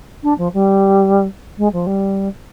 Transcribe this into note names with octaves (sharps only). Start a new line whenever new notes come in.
D4
F3
G3
G#3
F3
G3